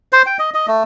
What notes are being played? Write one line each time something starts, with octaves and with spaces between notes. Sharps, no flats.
C5
G5
D#5
D#5
A3